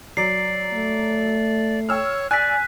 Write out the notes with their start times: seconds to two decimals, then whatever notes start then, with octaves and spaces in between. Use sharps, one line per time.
0.17 F#3 D5 C7
0.74 A3
1.89 C#5 G5 E6 F6
2.31 D5 G#5 F#6 B6